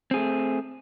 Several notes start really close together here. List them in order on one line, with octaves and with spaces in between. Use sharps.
C4 G#4 A3